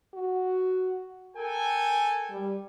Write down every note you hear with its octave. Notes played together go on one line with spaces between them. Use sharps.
F#4
A4 A#4 G5 G#5
G3